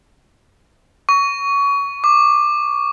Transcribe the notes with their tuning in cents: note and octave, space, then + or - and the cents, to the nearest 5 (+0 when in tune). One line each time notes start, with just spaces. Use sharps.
C#6 +25
D6 +20